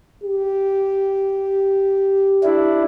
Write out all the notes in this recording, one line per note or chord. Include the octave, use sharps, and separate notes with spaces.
G4
D4 E4